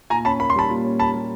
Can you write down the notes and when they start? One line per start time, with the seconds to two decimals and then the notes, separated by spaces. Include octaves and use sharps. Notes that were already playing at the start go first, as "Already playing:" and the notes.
0.10 A#2 G#5 A#5
0.25 C#4 A5 B5
0.40 A#3 B5
0.50 C6
0.55 G3 A5 B5
0.70 A#2
0.84 C#4
0.99 A#3 A5 B5
1.15 G3